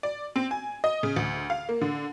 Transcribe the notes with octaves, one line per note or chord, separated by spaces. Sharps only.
D5
C4
G#5
D#5
C#3
D2
F5
A#3
D3